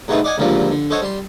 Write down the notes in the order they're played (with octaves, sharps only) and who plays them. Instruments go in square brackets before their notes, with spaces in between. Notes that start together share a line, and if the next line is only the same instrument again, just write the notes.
[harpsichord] G#2 B2 A3 C4 D#4 B4
D5 D#5 F#5 G#5
C#2 A#2 D3 F3 G3 C4
D3
A4 C5 C#5 D#5 F#5
G3 C6